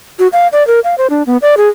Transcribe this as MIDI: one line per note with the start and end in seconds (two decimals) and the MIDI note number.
0.19 0.28 66
0.33 0.48 77
0.52 0.65 74
0.67 0.80 70
0.84 0.95 77
0.98 1.07 72
1.10 1.23 62
1.27 1.37 59
1.42 1.55 74
1.57 1.69 68